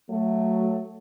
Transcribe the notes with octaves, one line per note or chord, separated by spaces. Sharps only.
F#3 A3